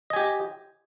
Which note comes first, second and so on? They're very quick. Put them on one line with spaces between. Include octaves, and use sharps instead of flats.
D#5 G#5 G4